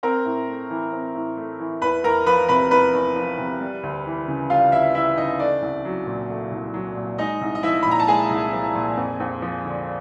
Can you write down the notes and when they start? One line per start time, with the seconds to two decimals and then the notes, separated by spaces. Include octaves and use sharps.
0.03 C4 A#4 A#5
0.25 A2
0.48 A3
0.70 E3
0.93 C4
1.15 A2
1.37 A3
1.60 E3
1.82 E2 B4 B5
2.04 E2 A#4 A#5
2.26 F3 B4 B5
2.49 C3 B4 B5
2.71 E2 B4 B5
2.94 E2
3.16 F3
3.38 C3
3.61 G3
3.83 D2
4.06 E3
4.28 C#3
4.50 G3 F4 F5
4.72 D2 E4 E5
4.95 E3 E4 E5
5.17 C#3 D#4 D#5
5.39 A3 D4 D5
5.62 C2
5.85 F#3
6.07 A#2
6.29 A3
6.51 C2
6.74 F#3
6.96 A#2
7.18 G#3 D#4 D#5
7.41 C2
7.55 D#5
7.63 F3 E4 E5
7.83 A#2 B5
7.91 A#5
8.00 A5
8.08 G#3 G#4 G#5
8.30 C2
8.53 F3
8.75 A#2
8.97 F2
9.20 F2
9.42 F3
9.65 D3